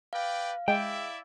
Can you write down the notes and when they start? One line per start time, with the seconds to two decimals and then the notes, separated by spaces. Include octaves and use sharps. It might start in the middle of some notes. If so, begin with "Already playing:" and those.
0.13 B4 D5 F5 G5
0.68 G#3 E4 D5 E5 G5